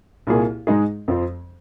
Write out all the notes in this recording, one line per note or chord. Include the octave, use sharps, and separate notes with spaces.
C2 A#2 A#3 G#4
G#2 G#3 D#4 G#4
F2 F3 C4